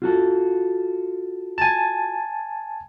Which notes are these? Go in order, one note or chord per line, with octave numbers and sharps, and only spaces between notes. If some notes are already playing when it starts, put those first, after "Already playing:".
F4 F#4 A4
G#5 A5